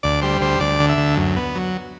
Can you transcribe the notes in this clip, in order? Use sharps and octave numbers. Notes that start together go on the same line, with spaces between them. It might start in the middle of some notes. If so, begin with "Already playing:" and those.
D2 D5
G3 C5
D2 C5
D2 D5
D3
E5
D2
F#2
B3
F#3